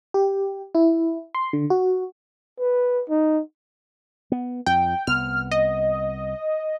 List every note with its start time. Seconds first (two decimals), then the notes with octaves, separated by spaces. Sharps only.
0.14 G4
0.75 E4
1.35 C6
1.53 D3
1.70 F#4
2.60 B4
3.10 D#4
4.32 B3
4.66 F2 G5
5.07 C2 B3 F6
5.51 D#5